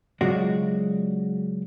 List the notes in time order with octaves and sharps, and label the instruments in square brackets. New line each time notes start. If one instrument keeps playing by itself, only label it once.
[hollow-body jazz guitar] C#3 F#3 G#3 F4 F#4 D5